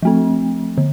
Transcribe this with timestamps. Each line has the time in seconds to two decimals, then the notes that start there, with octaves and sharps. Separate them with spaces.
0.02 F3 A3 C4
0.78 D3